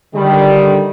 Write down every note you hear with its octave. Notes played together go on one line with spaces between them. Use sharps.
D3 D#3 G3